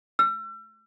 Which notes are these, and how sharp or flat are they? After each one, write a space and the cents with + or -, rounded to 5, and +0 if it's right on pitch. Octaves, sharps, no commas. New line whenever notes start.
E6 +40